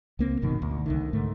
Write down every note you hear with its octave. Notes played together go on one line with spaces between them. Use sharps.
C#2 A#3 C4
G#1 F#2 B2 D#3
D2
C2 D3 D#3
G#2 A3